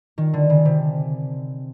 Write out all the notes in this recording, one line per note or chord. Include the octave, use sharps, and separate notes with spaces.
D#3
D3
C#3
C3